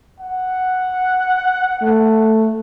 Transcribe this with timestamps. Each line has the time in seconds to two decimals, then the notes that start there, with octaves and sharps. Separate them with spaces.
0.20 F#5
1.82 A3